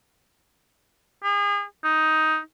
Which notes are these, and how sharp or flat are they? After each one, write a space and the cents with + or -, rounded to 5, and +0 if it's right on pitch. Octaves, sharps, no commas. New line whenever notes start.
G#4 -35
D#4 +10